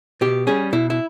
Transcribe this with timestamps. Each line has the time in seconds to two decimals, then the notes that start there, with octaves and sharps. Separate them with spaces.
0.21 B2 G4
0.47 G3 C#4 G#4
0.73 B2 E4
0.90 E4